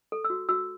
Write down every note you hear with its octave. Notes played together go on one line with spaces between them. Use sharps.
A4
E6
F#4
F#4 E6